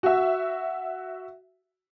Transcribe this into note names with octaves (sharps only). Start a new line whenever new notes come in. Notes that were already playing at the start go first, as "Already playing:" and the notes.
F#4 E5